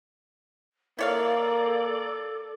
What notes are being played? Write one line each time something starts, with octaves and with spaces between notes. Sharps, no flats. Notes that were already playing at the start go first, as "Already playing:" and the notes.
A#3 E4 A4 C#5 D5 F5